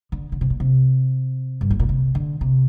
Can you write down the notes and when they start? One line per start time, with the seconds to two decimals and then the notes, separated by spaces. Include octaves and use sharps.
0.12 D3
0.32 D3
0.41 C3
0.50 A#2
0.60 C3
1.61 G2
1.70 A2
1.79 A#2
1.89 C3
2.15 D3
2.41 C3